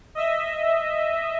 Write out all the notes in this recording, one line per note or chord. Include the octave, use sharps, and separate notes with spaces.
D#5 E5